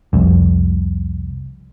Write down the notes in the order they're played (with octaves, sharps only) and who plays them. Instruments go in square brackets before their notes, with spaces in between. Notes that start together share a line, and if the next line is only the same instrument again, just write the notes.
[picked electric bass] F1 C2